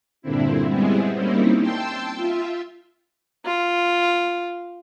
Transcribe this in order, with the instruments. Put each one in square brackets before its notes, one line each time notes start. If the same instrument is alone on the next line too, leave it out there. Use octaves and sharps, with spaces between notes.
[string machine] G2 A#2 D3 C4 E4
G3 G#3 B3 C4 E4 G#4
G3 A#3 C4 C#4 D#4 E4
G5 A5 C6 E6
F4 E5
[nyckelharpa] F4